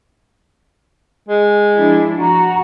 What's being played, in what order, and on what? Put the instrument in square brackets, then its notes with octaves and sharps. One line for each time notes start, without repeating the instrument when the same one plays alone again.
[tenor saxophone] G#3
[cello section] F3 D4 E4
[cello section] F#4 [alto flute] A#5